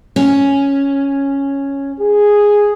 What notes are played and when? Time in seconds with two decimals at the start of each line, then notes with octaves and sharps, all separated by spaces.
0.16 C#4
2.00 G#4